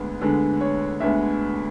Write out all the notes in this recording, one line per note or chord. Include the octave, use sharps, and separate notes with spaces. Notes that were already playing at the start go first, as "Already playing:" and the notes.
Already playing: D2 D3 G#3 B3
D2 D3 G#3 B3 A4
C#5
D2 D3 G#3 B3 E5